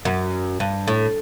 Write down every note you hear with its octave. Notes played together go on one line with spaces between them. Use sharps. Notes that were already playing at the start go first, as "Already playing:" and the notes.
F#2
G2
A2